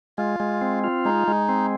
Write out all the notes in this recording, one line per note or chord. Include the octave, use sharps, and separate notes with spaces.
G#3 F4
G#3
C4
F4
G#3 D#4
G#3
C4